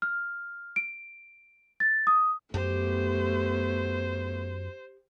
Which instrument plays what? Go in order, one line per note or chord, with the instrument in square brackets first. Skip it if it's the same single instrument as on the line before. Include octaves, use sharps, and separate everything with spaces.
[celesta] F6
D7
A6
D#6
[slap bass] F#2 [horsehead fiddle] A3 B3 [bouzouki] G4 [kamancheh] C5